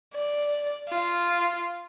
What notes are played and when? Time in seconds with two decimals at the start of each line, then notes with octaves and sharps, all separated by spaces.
0.15 D5
0.89 F4